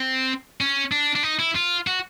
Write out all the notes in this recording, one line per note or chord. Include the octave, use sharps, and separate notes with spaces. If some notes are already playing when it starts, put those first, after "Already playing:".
Already playing: C4
C#4
D4
D4
D#4
E4
F4
F#4